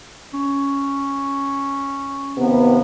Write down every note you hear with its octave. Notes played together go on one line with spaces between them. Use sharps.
C#4
D#2 C3 B3